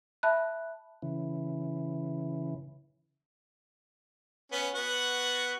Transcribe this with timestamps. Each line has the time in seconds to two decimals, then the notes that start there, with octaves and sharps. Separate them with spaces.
0.23 E5 A5 B5 F#6
1.02 C#3 E3
4.52 B3 C#4
4.75 B3 F#4 F#5